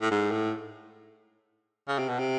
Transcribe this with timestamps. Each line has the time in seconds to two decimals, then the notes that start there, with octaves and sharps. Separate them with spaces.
0.01 A2
0.11 G#2
0.31 A2
1.88 C#3
1.99 C3
2.09 B2
2.19 C3